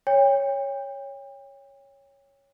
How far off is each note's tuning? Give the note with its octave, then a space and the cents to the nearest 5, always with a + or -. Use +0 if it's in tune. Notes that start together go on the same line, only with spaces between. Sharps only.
C#5 +0 G5 +35